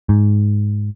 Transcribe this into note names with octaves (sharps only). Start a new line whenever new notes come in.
G#2